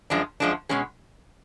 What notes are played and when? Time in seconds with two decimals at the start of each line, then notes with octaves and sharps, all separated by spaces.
0.10 F#2 F3 G#3 D4
0.40 F#2 F3 G#3 D4
0.69 B2 G#3 C#4 G#4